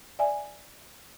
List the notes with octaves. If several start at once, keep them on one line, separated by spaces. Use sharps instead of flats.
D5 E5 G#5